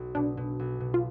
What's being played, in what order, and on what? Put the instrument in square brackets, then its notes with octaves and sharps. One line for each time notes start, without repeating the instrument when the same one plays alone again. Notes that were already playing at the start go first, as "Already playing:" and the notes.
Already playing: [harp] B1
[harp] B2 [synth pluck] D4
[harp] B2
B1
B2
[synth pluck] F4